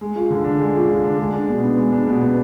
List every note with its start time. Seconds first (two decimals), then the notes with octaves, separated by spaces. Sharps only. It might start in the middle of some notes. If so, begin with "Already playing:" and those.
0.01 G#3
0.16 F4
0.31 D3
0.44 D4
0.59 G#3
0.74 F4
0.89 D3
1.04 D4
1.19 G#3
1.33 D4
1.48 B2
1.63 B3
1.78 G#3
1.92 D4
2.06 B2
2.21 B3